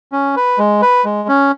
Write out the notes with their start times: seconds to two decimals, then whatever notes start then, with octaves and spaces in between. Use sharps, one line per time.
0.12 C#4
0.36 B4
0.59 G#3
0.82 B4
1.05 G#3
1.29 C#4